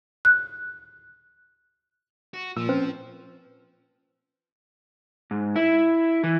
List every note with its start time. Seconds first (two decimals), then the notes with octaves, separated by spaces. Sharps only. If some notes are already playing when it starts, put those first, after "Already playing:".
0.25 F#6
2.34 F#4
2.57 A#2 F3 E6
2.69 C4 C#4 B4
5.31 G#2
5.56 E4
6.24 E3